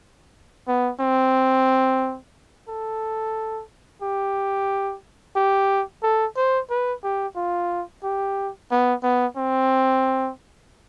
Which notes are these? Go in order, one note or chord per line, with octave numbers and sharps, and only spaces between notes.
B3
C4
A4
G4
G4
A4
C5
B4
G4
F4
G4
B3
B3
C4